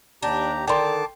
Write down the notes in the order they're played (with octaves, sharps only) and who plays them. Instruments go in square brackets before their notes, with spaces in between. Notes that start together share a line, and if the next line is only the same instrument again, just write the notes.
[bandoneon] D#2 G4 A#5 [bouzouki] D4
[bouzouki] D3 D#3 [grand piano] G5 C6 [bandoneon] A5 D6